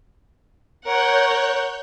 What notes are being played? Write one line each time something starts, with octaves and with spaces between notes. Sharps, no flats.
A#4 C#5 F#5 F#6 G6